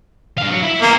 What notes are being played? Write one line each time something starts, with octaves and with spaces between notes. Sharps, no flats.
G2 F5
F#3
E4 E5
A#3 B3 C5